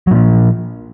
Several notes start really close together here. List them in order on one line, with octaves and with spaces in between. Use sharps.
F#3 A#2 F3